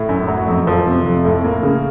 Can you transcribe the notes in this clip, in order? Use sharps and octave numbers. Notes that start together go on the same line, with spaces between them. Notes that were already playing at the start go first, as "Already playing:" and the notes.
Already playing: A2
F#2
F#3
F2
F3
C3
F2
A2
A#3
C#3